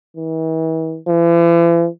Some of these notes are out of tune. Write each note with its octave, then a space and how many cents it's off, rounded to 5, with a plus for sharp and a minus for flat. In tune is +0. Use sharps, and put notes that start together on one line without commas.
E3 -40
E3 +45